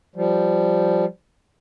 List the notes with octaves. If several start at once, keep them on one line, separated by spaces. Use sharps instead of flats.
F3 G3